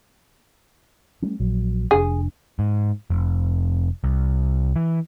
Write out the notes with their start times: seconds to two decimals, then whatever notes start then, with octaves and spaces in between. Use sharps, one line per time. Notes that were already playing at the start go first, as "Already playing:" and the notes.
1.22 G3 A3 C#4
1.40 A#1 F#3
1.91 F1 D4 G#4
2.59 G#2
3.10 F1
4.04 C2
4.76 E3